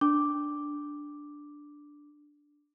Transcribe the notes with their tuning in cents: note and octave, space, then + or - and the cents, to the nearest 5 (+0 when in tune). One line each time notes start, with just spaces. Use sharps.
D4 +0 D6 +0